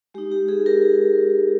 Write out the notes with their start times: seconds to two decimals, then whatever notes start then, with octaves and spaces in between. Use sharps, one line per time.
0.14 G#3 D#4 G4
0.32 G4
0.49 G#4
0.66 G4 A#4